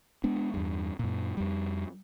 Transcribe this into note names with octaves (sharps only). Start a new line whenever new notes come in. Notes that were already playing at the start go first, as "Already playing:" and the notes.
G#3 B3 D4
E2 G2
F#2 A#2
F2 G3